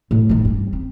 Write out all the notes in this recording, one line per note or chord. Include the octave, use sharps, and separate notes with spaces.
A2
D#3 G#3
G2
C4